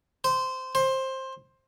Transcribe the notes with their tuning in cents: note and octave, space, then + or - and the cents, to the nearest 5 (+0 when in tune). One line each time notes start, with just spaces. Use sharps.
C5 -15
C5 +15